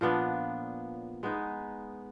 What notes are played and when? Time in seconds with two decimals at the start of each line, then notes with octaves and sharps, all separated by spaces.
0.01 A#2 F3 B3 D4
1.23 G#3 B3 D#4